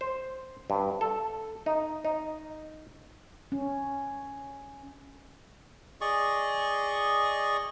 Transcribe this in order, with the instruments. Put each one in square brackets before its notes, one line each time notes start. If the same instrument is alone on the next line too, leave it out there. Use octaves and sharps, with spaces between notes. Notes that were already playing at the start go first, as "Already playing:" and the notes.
[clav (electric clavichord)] C5
G2
A4
D#4
D#4
[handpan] C#4
[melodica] G#4 D5 D#5 C#6